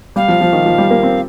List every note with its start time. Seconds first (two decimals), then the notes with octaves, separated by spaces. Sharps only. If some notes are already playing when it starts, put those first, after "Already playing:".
0.16 G3 F5
0.28 F3
0.41 F3
0.53 D#3
0.66 F3
0.78 G3
0.91 A#3
1.03 C4